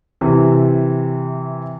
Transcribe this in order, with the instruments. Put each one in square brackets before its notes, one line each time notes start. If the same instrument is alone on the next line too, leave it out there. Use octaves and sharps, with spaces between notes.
[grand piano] C3 E3